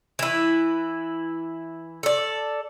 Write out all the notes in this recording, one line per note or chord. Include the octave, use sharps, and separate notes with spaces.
E3 E4
A4 D5